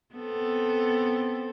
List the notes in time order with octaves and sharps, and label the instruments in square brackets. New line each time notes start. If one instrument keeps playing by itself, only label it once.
[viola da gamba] B3 C4 A4